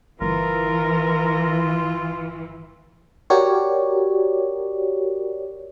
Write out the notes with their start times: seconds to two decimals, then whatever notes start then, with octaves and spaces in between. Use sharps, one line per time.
0.21 G1 E3 F4 A#4
3.30 F#4 G4 A#4 C#5 D5